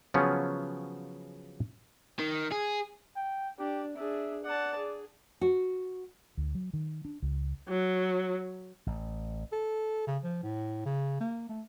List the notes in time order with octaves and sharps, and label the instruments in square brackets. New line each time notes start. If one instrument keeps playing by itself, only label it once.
[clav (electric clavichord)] C#3 F3 F#3 B3 C#4
[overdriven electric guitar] D#3
G#4
[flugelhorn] G5
[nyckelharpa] D4 [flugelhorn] G4
[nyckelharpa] D4 G#4 [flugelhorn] E5
[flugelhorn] D5 [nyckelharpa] F#5 A5
[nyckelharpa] G#4
[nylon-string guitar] F#4
[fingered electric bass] D2
F#3
D#3
D4
C#2
[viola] F#3
[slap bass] A1
[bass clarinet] A4
C#3
F3
A2
C#3
A#3
A3